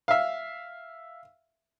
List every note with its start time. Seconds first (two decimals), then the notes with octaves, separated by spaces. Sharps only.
0.08 E5 F5